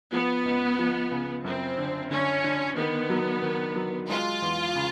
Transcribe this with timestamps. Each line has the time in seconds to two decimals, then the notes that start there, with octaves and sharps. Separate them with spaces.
0.12 F3 B3
0.45 C#2
0.79 F3
1.11 C#3
1.44 F#2 C4
1.78 D3
2.10 D3 C#4
2.44 D3
2.76 D#3 B3
3.10 F#3
3.42 D#3
3.76 F#3
4.09 G#3 F4
4.42 E2
4.75 C#3